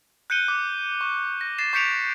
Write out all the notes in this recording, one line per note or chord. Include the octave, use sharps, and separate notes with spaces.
F#6 G6 C#7 D#7 G7
D6
C#6
A#6
A6 C7 E7
C#6 G6 B6 C#7 D7 F7